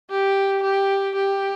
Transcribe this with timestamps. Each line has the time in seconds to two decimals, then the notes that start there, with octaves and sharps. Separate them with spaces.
0.10 G4
0.63 G4
1.15 G4